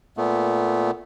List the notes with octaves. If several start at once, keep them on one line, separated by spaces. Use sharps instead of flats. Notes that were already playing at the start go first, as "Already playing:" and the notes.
A#2 A3 B3